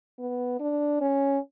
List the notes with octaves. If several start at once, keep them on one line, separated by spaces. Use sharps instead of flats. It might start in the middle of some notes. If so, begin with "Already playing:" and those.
B3
D4
C#4